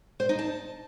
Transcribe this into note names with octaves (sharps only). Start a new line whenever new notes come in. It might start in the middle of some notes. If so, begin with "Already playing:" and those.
C5
D#4
A5